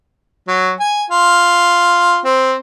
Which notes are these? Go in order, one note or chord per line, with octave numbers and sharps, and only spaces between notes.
F#3
G#5
F4
C4